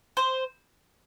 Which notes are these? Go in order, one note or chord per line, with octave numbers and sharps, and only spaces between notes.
C5